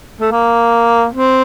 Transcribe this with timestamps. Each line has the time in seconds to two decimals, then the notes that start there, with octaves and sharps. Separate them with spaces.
0.21 A3
0.32 A#3
1.13 C4